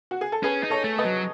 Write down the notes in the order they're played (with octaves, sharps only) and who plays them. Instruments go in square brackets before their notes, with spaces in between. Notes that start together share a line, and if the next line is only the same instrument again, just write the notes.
[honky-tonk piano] F#4
G#4
A4
[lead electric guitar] C#4 [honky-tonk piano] G#4 B4
[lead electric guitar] D#4
[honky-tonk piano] A4 C#5
[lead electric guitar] A3
[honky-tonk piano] B4 D#5
[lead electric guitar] F#3